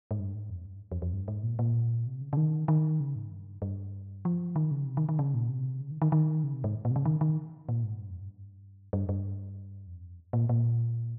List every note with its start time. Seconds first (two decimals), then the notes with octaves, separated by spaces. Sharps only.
0.11 G#2
0.19 G2
0.35 G#2
0.49 F2
0.66 G2
0.92 F2
1.02 F2
1.13 G2
1.28 G#2
1.43 A#2
1.59 A#2
2.06 C3
2.21 C#3
2.33 C#3
2.37 D#3
2.68 D#3
3.00 C#3
3.16 G#2
3.31 G2
3.62 G2
4.25 F3
4.56 D#3
4.71 C#3
4.87 C3
4.97 D#3
5.09 D#3
5.19 C#3
5.34 A#2
5.49 C3
5.80 C#3
5.91 D#3
6.02 D#3
6.12 D#3
6.44 C#3
6.54 C3
6.64 G#2
6.85 A#2
6.91 C3
6.96 C#3
7.05 D#3
7.21 D#3
7.69 A#2
7.83 G#2
8.00 G2
8.10 F2
8.20 G2
8.93 G2
9.09 G2
9.87 F2
10.33 A#2
10.49 A#2